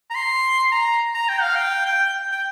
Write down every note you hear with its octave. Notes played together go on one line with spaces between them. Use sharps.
A#5
C6
A#5
A#5
G5
F5
G5
G5
G5